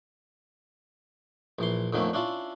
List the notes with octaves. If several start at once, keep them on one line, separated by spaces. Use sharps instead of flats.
A#1 E3 C6
F2 D3 D#3 A3 A#3 C#4
C#4 D4 E4 F4